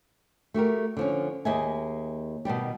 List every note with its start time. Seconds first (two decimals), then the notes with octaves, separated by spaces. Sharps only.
0.54 A3 F#4 G4 A#4
0.97 D3 F3 C#4
1.45 D#2 G#4 D#5 E5 G#5
2.45 B2 D#3 G3 G4